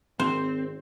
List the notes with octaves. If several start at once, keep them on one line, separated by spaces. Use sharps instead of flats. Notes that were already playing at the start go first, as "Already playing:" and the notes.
G#1 C4 C5